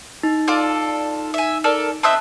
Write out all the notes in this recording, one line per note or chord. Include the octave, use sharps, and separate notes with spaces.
D#4
F4 A4 D5
E5 G#5
A4 A#4 D5
C4 D#5 E5 A5 E6 F#6